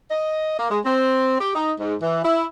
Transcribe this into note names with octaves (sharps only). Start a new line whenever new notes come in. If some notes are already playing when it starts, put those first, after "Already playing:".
D#5
A#3
G#3
C4
G4
D#4
G#2
E3
E4